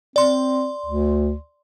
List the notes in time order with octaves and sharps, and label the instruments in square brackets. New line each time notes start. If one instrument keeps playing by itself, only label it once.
[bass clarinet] C4 [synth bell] D5 C6
[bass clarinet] D2